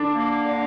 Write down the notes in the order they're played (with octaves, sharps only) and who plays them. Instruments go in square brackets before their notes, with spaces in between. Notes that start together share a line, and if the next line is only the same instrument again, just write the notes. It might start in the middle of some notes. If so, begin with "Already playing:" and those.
Already playing: [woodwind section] D3 [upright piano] D4
[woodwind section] A#3
D3